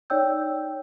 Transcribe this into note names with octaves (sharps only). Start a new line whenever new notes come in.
D#4 C#5 D5 G5 E6 G6